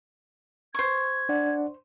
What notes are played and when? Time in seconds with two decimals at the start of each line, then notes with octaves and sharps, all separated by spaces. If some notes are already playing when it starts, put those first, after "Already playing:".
0.74 C5 C#6 G#6
1.29 D4 D5 F#5